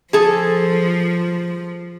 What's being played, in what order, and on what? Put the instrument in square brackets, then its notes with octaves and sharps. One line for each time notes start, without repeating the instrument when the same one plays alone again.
[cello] F3 [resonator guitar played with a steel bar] G#4 A4